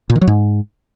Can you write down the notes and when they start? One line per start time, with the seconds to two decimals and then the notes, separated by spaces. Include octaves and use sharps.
0.10 A#2
0.15 D#3
0.21 F#3
0.27 G#2